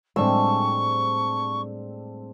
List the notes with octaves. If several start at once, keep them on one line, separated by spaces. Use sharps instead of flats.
A2 G3 G#3 C4 D4 C#6 E6